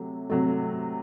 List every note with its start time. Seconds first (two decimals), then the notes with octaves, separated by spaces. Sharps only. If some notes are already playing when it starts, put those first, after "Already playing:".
Already playing: C3 F#3 A3
0.30 C3 F#3 A3